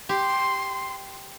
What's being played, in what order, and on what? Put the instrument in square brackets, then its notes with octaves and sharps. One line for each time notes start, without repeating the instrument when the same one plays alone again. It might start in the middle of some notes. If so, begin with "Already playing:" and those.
[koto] G4 [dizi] C6